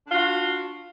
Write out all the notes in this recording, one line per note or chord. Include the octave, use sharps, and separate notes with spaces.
D4 F4 F#4